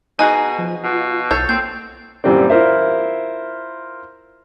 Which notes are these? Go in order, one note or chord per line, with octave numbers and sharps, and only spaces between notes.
B2 D#4 F#4 G#4 G#5
F3
B2 F4
B1 A4 C#5 G6
A#3 C4 G6
F#2 A#2 E3 G3 A#3 C4
E4 F4 A#4 C5 E5